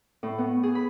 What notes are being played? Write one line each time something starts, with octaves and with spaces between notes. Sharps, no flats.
A2
B3
G#4
B5